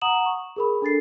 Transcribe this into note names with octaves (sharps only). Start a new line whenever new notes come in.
F#5 A#5 D#6 E7 F#7
C#6
G#4 A#4 B5
D4 A4 A6 C7